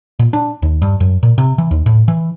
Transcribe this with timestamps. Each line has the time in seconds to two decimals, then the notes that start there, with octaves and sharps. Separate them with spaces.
0.19 A#2
0.33 D4
0.62 D#2
0.82 G2
1.00 F#2
1.23 A#2
1.38 C3
1.58 E3
1.71 D#2
1.86 A2
2.08 E3